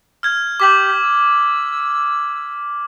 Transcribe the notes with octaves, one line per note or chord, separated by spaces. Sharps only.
F6 G#6
G4 D6 B6 F#7
E6